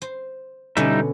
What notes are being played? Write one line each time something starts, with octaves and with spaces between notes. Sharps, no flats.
C5
B2 D3 G3 C#4 D#4 E5